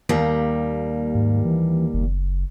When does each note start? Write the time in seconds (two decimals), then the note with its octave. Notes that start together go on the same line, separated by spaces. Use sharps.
0.09 D#2 G3 A#3
1.15 G#2
1.45 E3
1.94 F#1